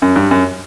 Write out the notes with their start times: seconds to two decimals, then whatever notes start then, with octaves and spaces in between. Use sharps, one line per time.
0.02 F#2
0.16 G2
0.31 F#2